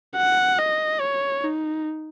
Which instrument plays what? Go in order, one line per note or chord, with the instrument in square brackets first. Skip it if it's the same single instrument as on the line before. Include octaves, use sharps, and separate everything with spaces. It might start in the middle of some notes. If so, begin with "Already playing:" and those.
[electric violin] F#5
D#5
C#5
D#4